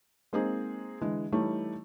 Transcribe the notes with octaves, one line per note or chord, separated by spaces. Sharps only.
G#3 A#3 C4 D#4 G#4
D3 E3 G#3
E3 G3 A3 D#4 E4 C#5